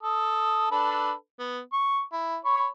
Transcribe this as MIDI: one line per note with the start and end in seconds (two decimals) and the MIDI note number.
0.03 0.68 69
0.03 0.68 87
0.71 1.12 62
0.71 1.12 69
0.71 1.12 71
1.39 1.59 59
1.73 2.01 85
2.12 2.37 64
2.45 2.67 73
2.45 2.67 83
2.45 2.67 85